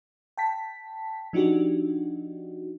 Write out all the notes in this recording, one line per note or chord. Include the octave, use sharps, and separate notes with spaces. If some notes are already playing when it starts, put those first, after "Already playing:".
G5 A5 B6
F3 D4 D#4 F#4 G4